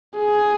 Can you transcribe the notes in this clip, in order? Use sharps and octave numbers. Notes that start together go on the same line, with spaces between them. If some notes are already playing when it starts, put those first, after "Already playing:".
G#4